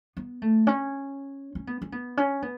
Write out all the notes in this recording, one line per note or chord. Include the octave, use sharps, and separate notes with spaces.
B3
A3
C#4
C#4
B3
C#4
B3
C#4
B3